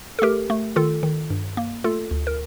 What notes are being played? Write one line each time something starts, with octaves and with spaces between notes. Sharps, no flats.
A4
A3 G4 A#4
A3
D#3 F4 A4
D#3
G2
A#3
A3 F4 A4
D2
A#4